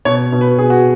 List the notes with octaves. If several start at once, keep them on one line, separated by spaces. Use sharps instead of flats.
B2 C#5
B2
B4
B2 G#4
F#4